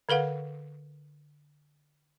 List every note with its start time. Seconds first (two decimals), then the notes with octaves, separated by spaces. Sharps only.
0.09 D3 A4 B4 F5 F#5